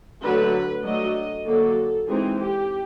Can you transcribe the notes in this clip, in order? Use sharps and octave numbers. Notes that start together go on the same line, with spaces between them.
D3 F#3 A3 B4
F#3 A3 D4 D#5
D3 F#3 A#3 A4
E3 G#3 C4 D#4 G#4
G4